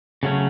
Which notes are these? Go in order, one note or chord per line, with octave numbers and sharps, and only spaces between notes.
C#3 F#3 A3 C#4